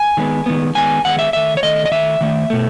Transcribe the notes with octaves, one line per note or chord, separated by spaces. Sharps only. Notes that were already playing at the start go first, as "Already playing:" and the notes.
Already playing: G#5
D#3 G#3 B3
D#3 G#3 B3
D#3 G#3 B3 G#5
D#3 G#3 B3 F#5
E5
D#3 A3 E5
C#5
D#3 A3 D#5
D#5
D#3 A3 E5
D#3 A3
B2 A3